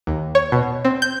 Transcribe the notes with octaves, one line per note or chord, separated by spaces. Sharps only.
D#2
C#5
B2
C4
G6